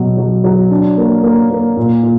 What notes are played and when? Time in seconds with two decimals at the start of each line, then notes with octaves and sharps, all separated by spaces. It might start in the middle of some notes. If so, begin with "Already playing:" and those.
Already playing: B2 F#3
0.17 F#3
0.44 F#3
0.71 D4
0.98 A#3
1.23 A#3
1.50 A#3
1.76 A#2
2.03 A#2